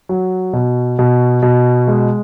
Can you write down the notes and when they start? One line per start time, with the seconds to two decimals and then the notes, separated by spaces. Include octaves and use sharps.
0.09 F#3
0.53 B2
0.99 B2
1.42 B2
1.87 G#3